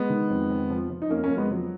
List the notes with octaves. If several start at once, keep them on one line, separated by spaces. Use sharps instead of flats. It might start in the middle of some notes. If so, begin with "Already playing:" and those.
Already playing: G#3 B3
D#3
F2
F2
F3
F3
D#4
F2 A#3 C#4
A#3 C#4
F2
G#3 B3
F3 F#3